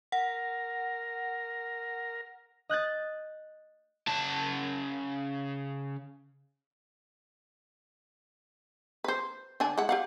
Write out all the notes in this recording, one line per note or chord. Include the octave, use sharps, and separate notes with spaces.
A#4 F#5
D#5 F#6 G6 A6
C#3 A5
B4 C5
D3 D4 G#5
G#3 E4 F#5
G4 F5 F#5